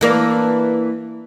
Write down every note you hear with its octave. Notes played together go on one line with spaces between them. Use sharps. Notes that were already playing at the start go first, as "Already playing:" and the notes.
E3 A#3 D4